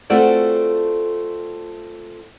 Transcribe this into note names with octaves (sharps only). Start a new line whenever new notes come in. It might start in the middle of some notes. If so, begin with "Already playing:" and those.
A3 C4 F4 F#4 A4 D5